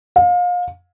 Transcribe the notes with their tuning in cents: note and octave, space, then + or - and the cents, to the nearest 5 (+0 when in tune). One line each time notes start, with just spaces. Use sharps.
F5 +30